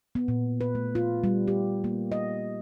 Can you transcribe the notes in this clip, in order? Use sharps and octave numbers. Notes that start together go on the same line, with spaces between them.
B3
A#2
B4
A3
F4
G3
G4
A#3
D#5